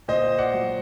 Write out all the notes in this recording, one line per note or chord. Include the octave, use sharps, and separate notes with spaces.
A#2 C5 D#5
D5 F#5
F#3